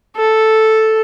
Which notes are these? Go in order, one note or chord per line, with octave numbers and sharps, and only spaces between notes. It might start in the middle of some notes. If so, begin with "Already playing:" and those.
A4